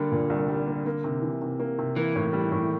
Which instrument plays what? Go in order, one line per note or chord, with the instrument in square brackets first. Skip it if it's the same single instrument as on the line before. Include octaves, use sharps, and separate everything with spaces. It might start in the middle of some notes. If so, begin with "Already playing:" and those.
Already playing: [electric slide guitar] D3 [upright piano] G3 A#3
[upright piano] A#2
C2
G3
A#3
A#3
C3
E3
C3
A#3
C3
[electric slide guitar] E3 [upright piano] A#3
[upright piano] A2
G3
A2